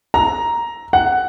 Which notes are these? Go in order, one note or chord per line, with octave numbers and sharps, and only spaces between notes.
A#5
F#5